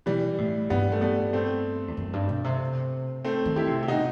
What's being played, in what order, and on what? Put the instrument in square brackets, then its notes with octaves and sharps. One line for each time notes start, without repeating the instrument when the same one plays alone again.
[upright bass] B2 [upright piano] E3 G3
[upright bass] A2
[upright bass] G2 [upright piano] G3 B3
[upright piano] A3
G3 B3
A3 C4
[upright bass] E2
F#2
G2
B2
C3
[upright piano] A3 C4
[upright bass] D#3
[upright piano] E4 G4
[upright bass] C3
[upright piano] G4
[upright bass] B2 [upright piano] D#4 F#4